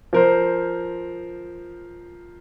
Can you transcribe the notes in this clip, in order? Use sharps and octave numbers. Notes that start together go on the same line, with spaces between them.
F3 A#4 C5